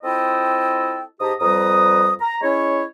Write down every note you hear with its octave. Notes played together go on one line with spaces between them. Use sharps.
C4 E4 F4 A4 D#5 G5
G#2 G4 A5 A#5 D#6
F2 G3 B4 A#5 D#6
A#5
G#3 C#4 E4 C#5